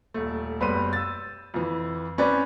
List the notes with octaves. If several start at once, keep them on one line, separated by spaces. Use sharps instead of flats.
D#1 A3
F#1 G3 B3 B4 C6 D#7
E6 A6
F2 E3
C4 C#4 B4 D5